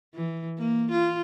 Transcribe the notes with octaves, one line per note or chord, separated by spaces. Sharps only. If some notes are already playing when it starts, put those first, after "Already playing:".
E3
A#3
F4